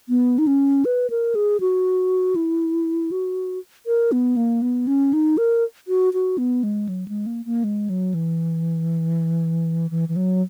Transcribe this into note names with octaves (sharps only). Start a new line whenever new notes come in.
B3
D#4
C#4
B4
A#4
G#4
F#4
E4
F#4
A#4
B3
A#3
B3
C#4
D#4
A#4
F#4
F#4
B3
G#3
F#3
G#3
A#3
A#3
G#3
F#3
E3
E3
E3
F#3